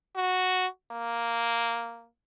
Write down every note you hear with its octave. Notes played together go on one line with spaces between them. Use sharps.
F#4
A#3